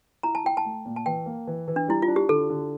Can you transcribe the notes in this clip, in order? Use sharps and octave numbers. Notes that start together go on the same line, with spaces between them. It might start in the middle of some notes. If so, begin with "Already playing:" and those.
E4 A#5
A5
E4 G5
A5
A3
A#2
A5
E3 G5
A#3
E3
E3
D4
G3 E4
F4
D4
G4
D3 A4
D3